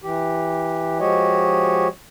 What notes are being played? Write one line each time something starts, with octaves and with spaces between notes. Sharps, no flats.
E3 G4
F3 G#3 F#4 G4 C#5 D#5